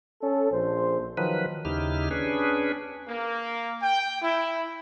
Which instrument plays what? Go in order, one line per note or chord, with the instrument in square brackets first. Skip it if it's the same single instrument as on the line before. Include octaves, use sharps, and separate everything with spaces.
[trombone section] C#4 A4
A#1 C5
[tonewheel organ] D#3 F3 F#3 B4
D#2 C#3 D#4 E4 G4 F6
C#4 D4 G#4 B4
[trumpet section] A#3
G5
E4